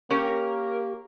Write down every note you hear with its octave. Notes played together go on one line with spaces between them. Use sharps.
A#3 C#4 G4 A#4 C#5